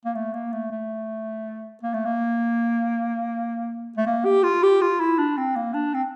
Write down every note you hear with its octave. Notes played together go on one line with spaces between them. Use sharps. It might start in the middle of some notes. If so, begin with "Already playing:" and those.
A#3
A3
A#3
A3
A3
A#3
A3
A#3
A3
A#3
G4
F4
G4
F4
E4
D4
C4
A#3
D4
C4